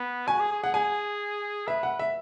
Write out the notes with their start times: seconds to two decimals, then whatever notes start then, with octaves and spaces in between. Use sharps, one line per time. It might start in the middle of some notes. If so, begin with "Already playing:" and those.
Already playing: B3
0.27 F#4 G#5
0.40 G#4
0.52 G#4
0.63 G#4 F#5
0.74 G#4 G#5
1.67 B4 E5
1.83 F#5
1.99 E5